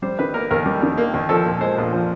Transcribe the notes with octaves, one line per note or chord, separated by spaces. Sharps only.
G3 C5
D#3 B4
A#3 A#4
D#2 A#4
G3
D#3
A#3
D#2
F3 A4
A#2
G#3 C5
A#1
F3